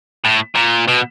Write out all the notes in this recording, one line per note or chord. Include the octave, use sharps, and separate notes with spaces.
A2
A#2
B2